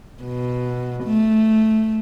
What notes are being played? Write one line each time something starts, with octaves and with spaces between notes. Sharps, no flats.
B2
A3